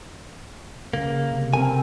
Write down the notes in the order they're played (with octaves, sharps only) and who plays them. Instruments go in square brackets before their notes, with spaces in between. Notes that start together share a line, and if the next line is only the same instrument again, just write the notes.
[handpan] C#3 [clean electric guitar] A#3
[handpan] C3
[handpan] C4 A4 A#4 [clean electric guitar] G#5